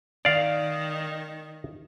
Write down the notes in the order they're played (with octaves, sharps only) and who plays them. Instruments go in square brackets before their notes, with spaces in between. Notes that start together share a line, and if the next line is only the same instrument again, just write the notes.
[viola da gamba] D#3 [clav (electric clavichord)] D5 F5